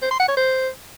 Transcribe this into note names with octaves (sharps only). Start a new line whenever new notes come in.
C5
C6
F#5
C#5
C5